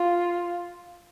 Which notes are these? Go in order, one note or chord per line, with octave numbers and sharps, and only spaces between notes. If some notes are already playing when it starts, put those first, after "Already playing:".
Already playing: F4